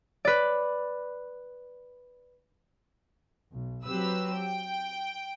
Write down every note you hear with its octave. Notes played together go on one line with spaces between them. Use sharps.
B4 D5
B1
F#3 C4 G4 B4 E6
G5